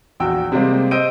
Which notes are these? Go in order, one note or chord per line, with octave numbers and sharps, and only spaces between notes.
A#1 E2 F#4 G5 E6
C3 G3 G#3 A#3 C5
C5 D#5 E6 G6 D7 D#7